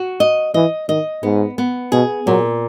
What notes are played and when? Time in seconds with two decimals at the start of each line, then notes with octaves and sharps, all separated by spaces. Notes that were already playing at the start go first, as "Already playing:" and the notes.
Already playing: F#4
0.20 D#5
0.54 E3 D#5
0.89 D#3 D#5
1.23 G#2 B3
1.58 B3
1.92 B2 G#4
2.26 A#2 F#3